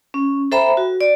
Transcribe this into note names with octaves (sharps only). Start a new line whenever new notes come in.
C#4
A4 C5 E5 G5 A#5 B5
F#4
D5